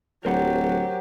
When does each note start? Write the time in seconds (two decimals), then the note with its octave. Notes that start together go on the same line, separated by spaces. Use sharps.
0.25 D1 F#3 G4 A#4 C5 F#5